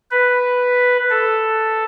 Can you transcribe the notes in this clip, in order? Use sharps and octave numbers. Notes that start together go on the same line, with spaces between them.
B4
A4